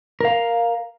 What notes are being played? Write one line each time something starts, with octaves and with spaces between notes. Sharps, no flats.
A#4 F5